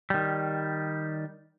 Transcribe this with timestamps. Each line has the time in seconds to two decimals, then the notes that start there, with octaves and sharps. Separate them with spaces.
0.10 D#3 G3